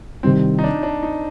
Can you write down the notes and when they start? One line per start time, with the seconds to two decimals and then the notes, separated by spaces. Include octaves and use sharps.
0.23 C2 C3 D#3 G3 C4
0.59 D#4
0.64 D4
0.83 D4
1.03 D#4